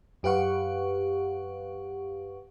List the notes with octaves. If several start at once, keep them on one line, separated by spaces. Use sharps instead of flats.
F#2 G4 B4 F5 F#5 C#6